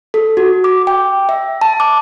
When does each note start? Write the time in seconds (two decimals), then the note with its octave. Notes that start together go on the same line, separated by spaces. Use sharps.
0.14 A4
0.37 F#4
0.64 D6
0.87 G5
1.29 E5
1.61 A5
1.80 D6